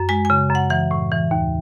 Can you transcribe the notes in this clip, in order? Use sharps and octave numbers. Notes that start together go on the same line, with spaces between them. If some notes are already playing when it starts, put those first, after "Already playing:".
Already playing: F#2
G#3 G#5
C#3 G#5
F#2
F#5
E3 F#5
A2
E3
D#2